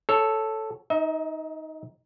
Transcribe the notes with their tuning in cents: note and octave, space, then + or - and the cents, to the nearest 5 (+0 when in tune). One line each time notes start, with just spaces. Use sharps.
A4 +0 C#5 +0
D#4 +10 E5 -45